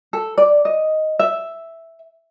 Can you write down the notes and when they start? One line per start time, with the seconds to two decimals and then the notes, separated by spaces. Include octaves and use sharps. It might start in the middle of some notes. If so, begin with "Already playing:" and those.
0.13 A4
0.38 D5
0.65 D#5
1.19 E5